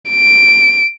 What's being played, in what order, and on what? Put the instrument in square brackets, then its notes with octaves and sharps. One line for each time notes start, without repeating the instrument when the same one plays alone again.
[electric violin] D7